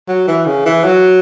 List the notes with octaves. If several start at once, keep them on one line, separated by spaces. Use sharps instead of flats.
F#3
E3
C#3
E3
F#3